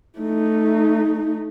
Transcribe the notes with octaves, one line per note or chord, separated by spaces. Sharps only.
A3 D#4